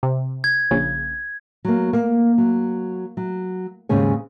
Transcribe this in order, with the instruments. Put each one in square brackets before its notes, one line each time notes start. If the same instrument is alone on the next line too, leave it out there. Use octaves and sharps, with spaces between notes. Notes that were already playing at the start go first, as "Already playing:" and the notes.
[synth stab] C3
[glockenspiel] G#6
[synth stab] A#1 C#3
[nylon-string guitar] F#3 A#3
A#3
F#3
F#3
D#2 G#2 C#3 G#4 C#5